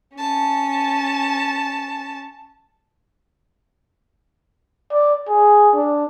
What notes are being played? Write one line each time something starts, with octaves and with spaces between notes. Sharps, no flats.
C#4 A5
D5
G#4
D4